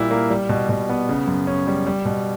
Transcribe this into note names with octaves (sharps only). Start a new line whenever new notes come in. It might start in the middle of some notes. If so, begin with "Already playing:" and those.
Already playing: A#2 G3 E4
A#3
G3
B2
B2
B3
C#3
F#2
C#4
G3
G3
B2